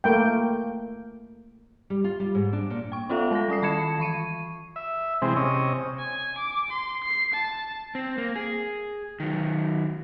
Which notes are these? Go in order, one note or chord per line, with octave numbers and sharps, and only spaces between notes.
A3 A#3 G5
G3
F4
G3
G#2
D4
A#2
G5 C#6
B3 C#4 F4 A4 E5 F5
G#3 A4 F#5 A#6
G3 C#4 D#6 C7
D#3 A5 B5 G#6 C#7 E7
E3 B5 C#6 D#7
E5
C3 E3 G#3 C4
C3 C#4 D#5
G#5
D6
C6
C7
A5
C4
A#3
G#4
D#3 F#3